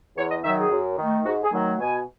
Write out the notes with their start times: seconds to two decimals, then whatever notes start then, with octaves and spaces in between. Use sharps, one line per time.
0.17 E2 C#5
0.31 D#5
0.44 D#3 F#3 E5
0.57 G#4
0.71 F#2
0.98 D#3 A3
1.25 G#2 F#4
1.44 G#4
1.52 D#3 F#3 A3
1.79 B2 G#5